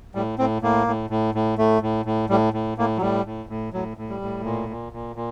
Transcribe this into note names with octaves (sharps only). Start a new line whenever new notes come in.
A2 G3
A2 C4
A2 A#3
A2
A2
A2
A2 A3
A2
A2
A2 G3
A2
A2 A#3
F#3
A2 G3
A2
A2
A2 F#3
A2
G3
A2
A#2
A#2
A#2
A#2